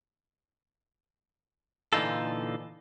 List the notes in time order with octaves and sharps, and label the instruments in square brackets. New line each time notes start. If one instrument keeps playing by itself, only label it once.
[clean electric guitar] A#2 D3 E3 D#4 F4 A4